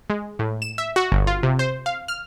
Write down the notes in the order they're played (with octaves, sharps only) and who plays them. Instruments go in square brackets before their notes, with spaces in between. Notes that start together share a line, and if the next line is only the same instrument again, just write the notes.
[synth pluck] G#3
A2
E7
E5
F#4
G1
F4
C3
C5
F5
F6